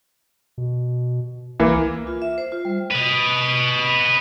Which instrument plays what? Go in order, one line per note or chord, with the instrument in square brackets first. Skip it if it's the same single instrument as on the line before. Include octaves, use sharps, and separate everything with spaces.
[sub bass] B2
[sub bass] C2 [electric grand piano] E3 A#3
[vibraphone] F4
E5
C5
F4
G3
[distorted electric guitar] B4 D#5